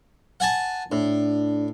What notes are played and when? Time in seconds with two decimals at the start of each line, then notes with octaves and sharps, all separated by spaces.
0.40 F#5 G#5 A5
0.92 A2 D4